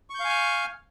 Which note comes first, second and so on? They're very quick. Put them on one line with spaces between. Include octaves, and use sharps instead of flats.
C#6 G6 F5 G#5 F6